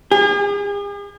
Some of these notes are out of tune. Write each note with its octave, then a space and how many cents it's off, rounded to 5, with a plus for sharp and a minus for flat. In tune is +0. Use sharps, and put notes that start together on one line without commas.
G#4 -45